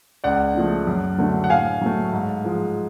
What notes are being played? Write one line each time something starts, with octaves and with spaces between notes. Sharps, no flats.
C#2 D5 F#5
C#3 F3 A3
F#2
D3 F#3 A3
F#5
A2 F5 G#5
F#3 A3
G#2
F3 G#3